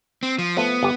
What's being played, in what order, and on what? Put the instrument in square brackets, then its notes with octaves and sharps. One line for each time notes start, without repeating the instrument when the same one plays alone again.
[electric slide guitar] C4
F3
[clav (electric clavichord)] F3 A3 [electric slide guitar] B3
[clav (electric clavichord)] G1 G4